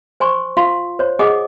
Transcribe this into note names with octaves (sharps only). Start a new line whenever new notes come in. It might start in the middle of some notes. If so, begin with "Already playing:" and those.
C5 G#5 C6 C#6
F4 F5 C6
C5 C#5
G#4 D#5 F#5 G#5 D6 D#6